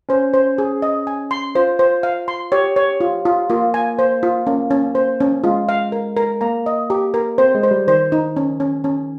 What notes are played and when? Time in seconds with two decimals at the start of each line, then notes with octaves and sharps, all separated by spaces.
0.09 C#4 C5
0.33 C5
0.58 G#4
0.82 D#5
1.07 G#5
1.31 C6
1.55 F4 C5
1.79 C5
2.03 F5
2.28 C6
2.52 G4 C#5
2.76 C#5
3.00 F4
3.25 F4
3.50 A#3 F4
3.74 G#5
3.99 C5
4.23 F4
4.47 A#3 C#4
4.71 C#4
4.95 C5
5.20 C#4
5.44 G#3 F4
5.69 F5
5.92 A#4
6.17 A#4
6.41 A#3 A#5
6.66 D#5
6.90 G4
7.14 A#4
7.38 C4 C5
7.55 G#3
7.63 C5
7.71 G3
7.87 D#3 C5
8.12 D#4
8.37 C#4
8.60 C#4
8.84 C#4